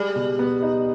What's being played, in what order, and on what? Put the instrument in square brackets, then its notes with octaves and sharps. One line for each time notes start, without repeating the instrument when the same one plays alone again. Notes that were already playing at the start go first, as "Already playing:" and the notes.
Already playing: [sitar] G3 [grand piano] G#3
[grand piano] B2
B3
D#4